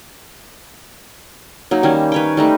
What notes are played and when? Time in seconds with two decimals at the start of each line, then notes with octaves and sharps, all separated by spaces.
1.71 F#3 A#3 D#4
1.83 D#3 G3 A#3 C#4
2.12 B4 C#5 G5
2.37 G3 A3 D#4